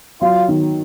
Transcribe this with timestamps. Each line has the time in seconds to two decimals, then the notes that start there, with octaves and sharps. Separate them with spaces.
0.21 F#3 F4
0.49 D#3